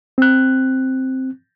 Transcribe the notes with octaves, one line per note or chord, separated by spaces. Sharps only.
C4 F#6